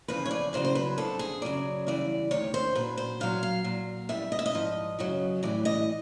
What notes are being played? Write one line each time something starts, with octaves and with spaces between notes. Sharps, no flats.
E2 C#3 F3 B4
C#5
D5
E2 C#3 F#3 C5
C5
B4
F2 D3 F3 A4
G#4
F#2 C#3 F#3 D5
E2 C#3 E3 G3 D5
D2 C3 D#3 C#5
C5
A#2 F#3 B4
C5
A#2 F#3 F5
F5
A#2 F#3
E2 B2 G3 E5
D#5
E5
D#5
G#2 F3
F#2 C#3 F#3
A2 E3 G3 D5
D#5